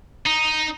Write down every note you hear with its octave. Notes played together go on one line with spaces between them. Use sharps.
D#4